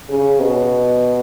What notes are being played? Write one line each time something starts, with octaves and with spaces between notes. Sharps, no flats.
C#3
B2